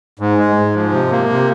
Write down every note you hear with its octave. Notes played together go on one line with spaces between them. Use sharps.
G#2
G#3
G#2
F3
C3
A#3
C3